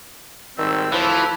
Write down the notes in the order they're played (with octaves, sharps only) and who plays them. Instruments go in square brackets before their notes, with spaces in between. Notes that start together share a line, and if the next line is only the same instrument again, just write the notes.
[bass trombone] G#1 [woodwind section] D#3 G3 C4 [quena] E6
[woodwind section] D2 A2 B5 [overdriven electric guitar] E3 [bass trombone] F3